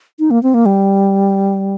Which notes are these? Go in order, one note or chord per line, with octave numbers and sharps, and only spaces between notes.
D#4
A#3
C4
A#3
G3